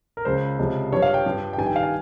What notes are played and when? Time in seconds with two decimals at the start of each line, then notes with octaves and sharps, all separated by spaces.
0.17 A#4
0.25 C#2 C#3 F3 C5
0.59 C#2 C3 F3
0.92 G2 F3 C#5
1.02 F5
1.14 G5
1.26 G2 F3
1.53 G5
1.58 G2 D#3 G#5
1.66 G5
1.76 F5
1.83 G#5